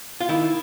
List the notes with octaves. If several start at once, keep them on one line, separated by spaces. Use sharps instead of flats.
F4
D#3 E4